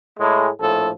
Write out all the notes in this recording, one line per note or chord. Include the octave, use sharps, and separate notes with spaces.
A2 G#3
A#1 A2 F3 A4